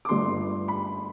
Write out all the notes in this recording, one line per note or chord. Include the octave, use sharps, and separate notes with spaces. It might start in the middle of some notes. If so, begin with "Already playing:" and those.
D6
G1 G2 D3 A3 C6
B5